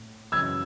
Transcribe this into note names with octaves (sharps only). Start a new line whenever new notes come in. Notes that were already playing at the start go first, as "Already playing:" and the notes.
Already playing: A2
F#2 C#3 E3 E6 G#6